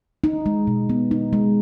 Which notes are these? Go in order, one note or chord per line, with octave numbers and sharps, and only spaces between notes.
D#4
G#3
B2
B3
D#4
G#3